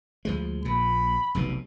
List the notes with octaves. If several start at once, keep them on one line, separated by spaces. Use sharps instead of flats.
D2 F3 G#3
A#1 A#2 B5
F1 B1 B2